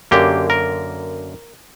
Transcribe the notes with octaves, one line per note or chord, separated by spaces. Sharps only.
F#2 D3 A#3 G4
A#4